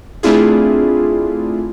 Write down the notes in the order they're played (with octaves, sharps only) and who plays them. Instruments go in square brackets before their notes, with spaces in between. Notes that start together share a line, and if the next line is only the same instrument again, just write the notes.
[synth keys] A3 C4 D4 E4 F4 G#4